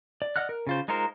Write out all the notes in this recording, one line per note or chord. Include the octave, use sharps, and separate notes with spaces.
D5
D5 D#5 F#5 F6 F#6
A#4
C#3 F4 C5
G#3 D#4 F4 A#4 C5